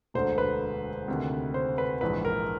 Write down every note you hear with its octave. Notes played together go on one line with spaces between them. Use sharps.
E1 D2 D3 C5
B4
D2 C3 D#3
C5
B4
A#1 G#2 E3 B4
A#4